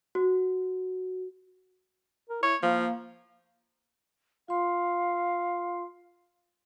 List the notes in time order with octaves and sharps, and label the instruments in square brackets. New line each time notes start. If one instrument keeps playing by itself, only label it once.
[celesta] F#4
[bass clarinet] A#4
[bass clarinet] E4 [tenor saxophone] C#5
[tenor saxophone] F3 [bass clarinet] A#3
[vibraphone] F4 C6 [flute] F5